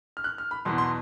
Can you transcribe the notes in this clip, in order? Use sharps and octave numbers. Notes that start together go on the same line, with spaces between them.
F6
F#6
F6
B5
E2 B2 F#3 C6
C6